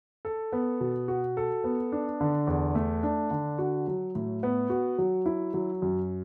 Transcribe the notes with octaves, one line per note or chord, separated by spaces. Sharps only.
A4
B3
B2
F#4
A4
B3
D4
D3
E2
A3
D4
D3
F#4
F#3
A2
B3
F#4
F#3
E4
F#3
F#2